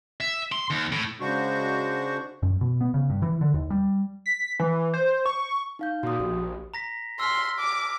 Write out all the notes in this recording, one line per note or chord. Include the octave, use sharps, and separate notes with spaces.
E5
C6
D#2
A2
C#3 G#3 D4 F#4 C5 C#6
F#2
B2
B3
C#3
G2
E3
D3
D#2
G3
B6
E3
C5
C#6
D#4 F5 G6
A#2 F#4 D#6
A#1 G4
A#5 A#6 B6
C6 E6 F6 B6
D6